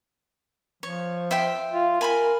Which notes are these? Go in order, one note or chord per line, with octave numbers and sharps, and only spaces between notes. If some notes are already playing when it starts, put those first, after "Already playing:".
F3 C#5
E5 G5 C6
F4
A#4 G#5 B5 C6